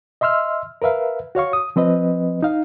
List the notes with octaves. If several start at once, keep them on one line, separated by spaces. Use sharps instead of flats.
D#5 E5 C6 E6 F6
A#4 B4 E5 F5
F#4 C#5 F5 C#6
D#6
F3 C4 B4 D#5
D#4 F5